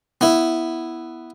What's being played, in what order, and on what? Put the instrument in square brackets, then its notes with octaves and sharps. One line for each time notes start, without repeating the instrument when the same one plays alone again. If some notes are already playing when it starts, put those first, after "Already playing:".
[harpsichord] B3 E4